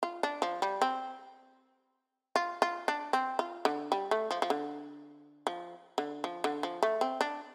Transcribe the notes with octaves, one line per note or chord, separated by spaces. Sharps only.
F4
D4
F3
G3
C4
F4
F4
D4
C4
F4
D3
G3
A3
F3
F3
D3
F3
D3
F3
D3
F3
A3
C4
D4